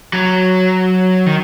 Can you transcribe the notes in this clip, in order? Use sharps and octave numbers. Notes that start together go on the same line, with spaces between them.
F#3
D#3